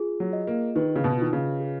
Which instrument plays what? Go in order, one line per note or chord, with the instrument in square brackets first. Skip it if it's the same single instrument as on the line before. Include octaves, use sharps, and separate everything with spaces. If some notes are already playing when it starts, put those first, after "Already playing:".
Already playing: [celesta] F4 G#4
[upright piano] F#3
[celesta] D#5
[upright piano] A#3
[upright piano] D#3 [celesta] B4
[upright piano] C#3
B2
[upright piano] D#3 [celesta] F4
[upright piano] C#3
[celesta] G#4